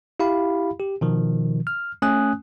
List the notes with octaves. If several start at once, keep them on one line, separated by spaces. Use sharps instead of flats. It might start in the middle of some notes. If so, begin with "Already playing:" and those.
E4 G4 F5 B5
G4
B2 D#3 F3
F6
A3 C#4 G#5 D#6 F#6